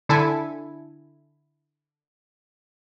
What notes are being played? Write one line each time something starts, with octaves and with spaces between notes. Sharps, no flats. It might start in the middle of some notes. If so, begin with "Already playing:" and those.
D3 E4 A4 G#5